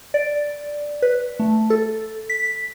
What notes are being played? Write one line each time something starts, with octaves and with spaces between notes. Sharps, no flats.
D5
B4
A3
A4
B6